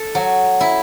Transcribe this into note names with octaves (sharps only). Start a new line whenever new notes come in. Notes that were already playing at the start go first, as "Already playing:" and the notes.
Already playing: A4
F#3
E4